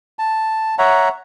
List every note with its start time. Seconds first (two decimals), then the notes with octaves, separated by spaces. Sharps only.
0.19 A5
0.79 C#5 E5 F#5 A#5